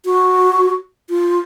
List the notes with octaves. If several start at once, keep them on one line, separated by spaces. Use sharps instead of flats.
F#4
F4